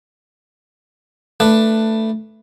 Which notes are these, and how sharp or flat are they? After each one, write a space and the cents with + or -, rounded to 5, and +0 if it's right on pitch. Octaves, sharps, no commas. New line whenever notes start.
A3 +10 D4 +10 B4 -5